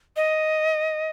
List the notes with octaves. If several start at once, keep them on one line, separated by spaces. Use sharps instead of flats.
D#5